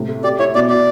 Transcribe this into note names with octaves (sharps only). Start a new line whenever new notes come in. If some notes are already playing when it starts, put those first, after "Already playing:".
Already playing: A2 C3
A3
G4 D5
E4 C#5
B2 D5
F#4 D5